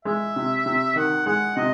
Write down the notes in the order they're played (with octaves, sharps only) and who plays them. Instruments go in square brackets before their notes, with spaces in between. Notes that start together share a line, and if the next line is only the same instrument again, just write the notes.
[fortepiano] G#3 [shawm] E5
[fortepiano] C3
C3
[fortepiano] D#3 [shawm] F#5
[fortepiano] G#3 [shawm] F#5
[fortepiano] C3 [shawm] D#5